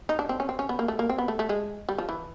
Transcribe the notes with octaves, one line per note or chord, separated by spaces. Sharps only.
D#4
D4
C4
C#4
C4
C#4
B3
A#3
A3
A#3
C4
B3
A3
A3
G#3
G3
F3
E3